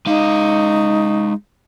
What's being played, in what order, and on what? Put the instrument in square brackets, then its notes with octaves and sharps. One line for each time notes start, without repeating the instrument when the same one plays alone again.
[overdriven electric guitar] G#3 F5 [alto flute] D#4